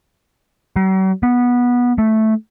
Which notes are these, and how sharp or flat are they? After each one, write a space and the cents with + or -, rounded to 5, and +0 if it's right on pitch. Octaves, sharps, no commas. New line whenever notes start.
F#3 +45
B3 -15
A3 -5